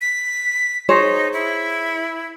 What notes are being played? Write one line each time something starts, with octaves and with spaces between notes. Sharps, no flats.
B6
D#4 G#4 C5 C#5
E4